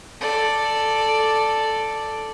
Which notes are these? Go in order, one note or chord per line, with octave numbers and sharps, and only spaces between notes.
A4 D5